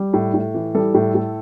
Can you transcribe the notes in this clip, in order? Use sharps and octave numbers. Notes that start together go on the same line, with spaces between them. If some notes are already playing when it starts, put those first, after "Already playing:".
Already playing: G3
A2
A2
E3
G3 A4
A2
A2